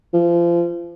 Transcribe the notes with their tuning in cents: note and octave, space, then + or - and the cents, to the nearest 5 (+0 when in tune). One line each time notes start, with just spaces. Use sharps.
F3 -30